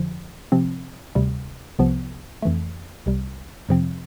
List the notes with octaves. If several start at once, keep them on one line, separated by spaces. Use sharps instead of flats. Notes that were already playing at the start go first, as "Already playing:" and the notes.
Already playing: F2 D3 F3
C3 F3 C4
D2 C3 G3
C2 C3 F3 B3
F2 E3 A3
C2 C3 G3
F2 C3 F3 C4